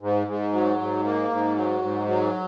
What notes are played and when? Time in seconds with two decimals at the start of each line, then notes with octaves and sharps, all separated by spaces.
0.01 G#2
0.27 G#2
0.53 F#3
0.78 G#2
1.04 A#3
1.30 G#2
1.55 F#3
1.82 G#2
2.08 F#3